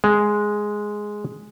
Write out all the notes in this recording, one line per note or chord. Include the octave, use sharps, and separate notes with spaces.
G#3